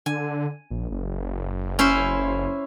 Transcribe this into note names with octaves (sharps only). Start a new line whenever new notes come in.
D3 G#5
A#1
F#1
C#4 E4 C5